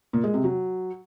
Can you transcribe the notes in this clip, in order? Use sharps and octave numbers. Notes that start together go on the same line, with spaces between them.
A#2
G#3
C3
F#3